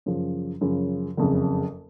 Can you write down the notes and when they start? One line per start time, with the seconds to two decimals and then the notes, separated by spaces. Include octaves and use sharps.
0.06 F#2 C#3 F3
0.61 F#2 C#3 F3
1.17 F#1 F2 C#3